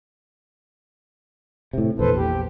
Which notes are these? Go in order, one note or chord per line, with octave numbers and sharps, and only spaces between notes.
A2 C3
A#1 E2 A4 B4 C5
G4